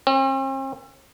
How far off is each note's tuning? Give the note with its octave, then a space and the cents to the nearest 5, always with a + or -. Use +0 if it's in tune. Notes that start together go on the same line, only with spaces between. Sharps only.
C4 +45